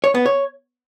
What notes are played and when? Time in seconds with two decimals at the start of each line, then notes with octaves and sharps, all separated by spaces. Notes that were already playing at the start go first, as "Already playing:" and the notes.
0.04 C#5
0.15 B3
0.26 C#5